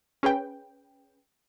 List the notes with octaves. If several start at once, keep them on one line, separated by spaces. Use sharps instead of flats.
C#4 G#4 B4 G5